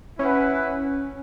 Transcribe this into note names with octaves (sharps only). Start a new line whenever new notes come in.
C#4 E4 B4 F#5